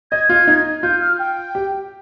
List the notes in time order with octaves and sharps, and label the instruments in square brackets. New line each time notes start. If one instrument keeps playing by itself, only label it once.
[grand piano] D#5 [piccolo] G#6
[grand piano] F4
D#4
[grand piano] F4 [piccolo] G6
[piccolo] F6
G5
[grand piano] G4